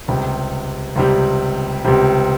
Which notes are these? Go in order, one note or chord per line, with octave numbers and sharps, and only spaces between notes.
C#2 C3 G3
C#2 C3 G3
C#2 C3 G3